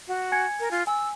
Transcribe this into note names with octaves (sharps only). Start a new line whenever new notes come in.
F#4
G#5 G#6 C#7
A#4
F4
G#5 E6